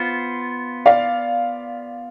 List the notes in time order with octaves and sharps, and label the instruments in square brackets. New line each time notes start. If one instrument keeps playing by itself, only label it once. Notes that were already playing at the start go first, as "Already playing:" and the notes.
Already playing: [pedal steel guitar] B3 F4 C5
[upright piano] D5 F5